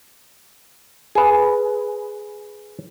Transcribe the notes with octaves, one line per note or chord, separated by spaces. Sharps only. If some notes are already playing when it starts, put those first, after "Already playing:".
G#4 B4